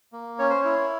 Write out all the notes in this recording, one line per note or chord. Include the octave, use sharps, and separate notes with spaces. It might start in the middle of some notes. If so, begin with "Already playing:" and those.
A#3
C#4 C#5
C5
E4 C#5